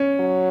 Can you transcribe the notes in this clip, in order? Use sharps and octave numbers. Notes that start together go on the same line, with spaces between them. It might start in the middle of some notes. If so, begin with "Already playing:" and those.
Already playing: C#4
F#3